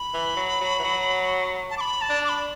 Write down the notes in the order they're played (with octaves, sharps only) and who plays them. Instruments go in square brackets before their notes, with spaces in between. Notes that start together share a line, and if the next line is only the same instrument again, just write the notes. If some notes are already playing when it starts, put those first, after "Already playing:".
Already playing: [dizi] B5
[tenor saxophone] E3
F#3
F#3
E3
F#3
[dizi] A5
D6
B5
A5
[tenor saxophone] D4
[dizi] D6
B5